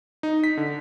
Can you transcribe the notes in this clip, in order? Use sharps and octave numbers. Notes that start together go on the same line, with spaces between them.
D#4
B6
D3